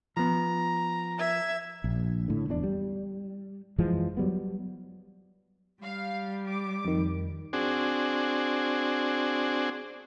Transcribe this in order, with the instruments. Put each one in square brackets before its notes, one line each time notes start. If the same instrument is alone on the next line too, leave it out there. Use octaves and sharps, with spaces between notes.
[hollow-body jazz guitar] F3 B3 [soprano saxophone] A#5
[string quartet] E5 G#6
[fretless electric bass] A#1
A2 D3
D1 E2 G3 D4
G3
F#2 E3 F3 G#3
F#3 G3 B3
[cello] G3 [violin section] F5
[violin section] D6
[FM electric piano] F2 D#3
[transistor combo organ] C4 D4 F#4 G#4